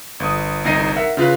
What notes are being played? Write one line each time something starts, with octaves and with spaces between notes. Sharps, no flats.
G1 D#6
G1 C2 D#4 A#6 C7 D#7
A#4 E5 F#5
C#3 F4 B4 F#6